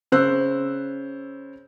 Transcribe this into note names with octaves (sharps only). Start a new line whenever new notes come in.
C#3 C5 E6 F#6